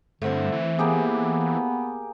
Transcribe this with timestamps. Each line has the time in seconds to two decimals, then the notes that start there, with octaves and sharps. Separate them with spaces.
0.22 G2 D3 A3 C4 E4
0.52 E3
0.79 A#3 B3 G4 G#4